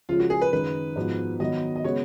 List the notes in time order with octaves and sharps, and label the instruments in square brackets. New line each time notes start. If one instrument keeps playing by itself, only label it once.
[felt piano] C#3 F3 G#3 [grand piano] F4
[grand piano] F#4
G#4
B4
[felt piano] F#2 D#3 G#3 D#4 [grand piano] B4
[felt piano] G#2 F3 B3 F#4
[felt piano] D#3 F#3 B3 [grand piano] D#5
[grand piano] D#5
[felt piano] C#3 G#3 B3 F#4 [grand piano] C#5